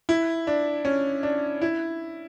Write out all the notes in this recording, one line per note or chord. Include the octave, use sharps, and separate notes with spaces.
E4
D4
C#4
D4
E4